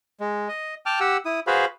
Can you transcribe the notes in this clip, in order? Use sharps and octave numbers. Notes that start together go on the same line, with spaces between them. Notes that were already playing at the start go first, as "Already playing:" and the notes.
G#3
D#5
G5 A5 D6 F6
G4 F#5 E6
E4 D#6
F#4 G#4 B4 C5 F5 B5